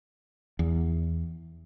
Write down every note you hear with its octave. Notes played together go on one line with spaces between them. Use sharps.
E2